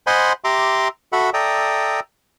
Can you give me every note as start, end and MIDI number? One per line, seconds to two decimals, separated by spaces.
0.07 0.33 72
0.07 0.33 75
0.07 0.33 78
0.07 0.33 80
0.07 0.33 83
0.07 0.33 84
0.44 0.88 67
0.44 0.88 76
0.44 0.88 82
0.44 0.88 84
0.44 0.88 86
1.13 1.30 66
1.13 1.30 69
1.13 1.30 76
1.13 1.30 78
1.13 1.30 83
1.34 2.00 69
1.34 2.00 74
1.34 2.00 76
1.34 2.00 79
1.34 2.00 82
1.34 2.00 87